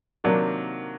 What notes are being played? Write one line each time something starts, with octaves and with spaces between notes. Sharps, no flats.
C3 D#3 F#3 A#3 D4